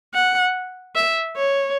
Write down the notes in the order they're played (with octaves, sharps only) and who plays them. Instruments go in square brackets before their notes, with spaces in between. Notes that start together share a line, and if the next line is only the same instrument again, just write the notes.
[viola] F#5
E5
C#5